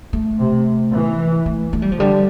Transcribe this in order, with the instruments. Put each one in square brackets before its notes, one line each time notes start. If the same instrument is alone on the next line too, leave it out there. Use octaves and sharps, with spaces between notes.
[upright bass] A3
[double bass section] C3
E3
[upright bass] A3
A3
G3
F3
[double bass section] D3 [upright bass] G3